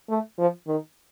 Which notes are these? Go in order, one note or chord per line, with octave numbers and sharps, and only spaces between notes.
A3
F3
D#3